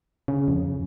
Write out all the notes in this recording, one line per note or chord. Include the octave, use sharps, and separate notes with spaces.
C#3
F2